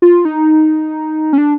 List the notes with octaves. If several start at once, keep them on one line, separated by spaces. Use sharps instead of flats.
F4
D#4
C#4
D4